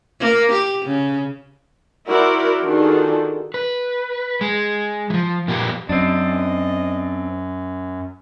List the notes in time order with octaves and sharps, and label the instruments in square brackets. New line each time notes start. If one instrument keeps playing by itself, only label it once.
[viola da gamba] A#3
G4
C#3
[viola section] E4 F#4 A#4 C5 D5
D#3 D4 F4 F#4 G#4 A4
[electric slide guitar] B4
G#3
E3 F3
A#2 F3 A#3 B3 G4
[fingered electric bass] F#2 [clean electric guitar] C4 D4 [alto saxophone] D#5